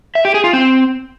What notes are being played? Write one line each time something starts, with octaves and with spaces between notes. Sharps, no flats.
E5
G4
G#4
F4
C4